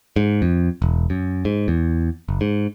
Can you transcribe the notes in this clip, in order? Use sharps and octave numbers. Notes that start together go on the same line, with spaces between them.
G#2
F2
E1
F#2
G#2
E2
F#1
G#2